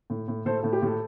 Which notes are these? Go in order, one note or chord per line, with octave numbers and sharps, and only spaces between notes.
A2
A2
A2 A4 C5
A2 A4
G4
A2 A4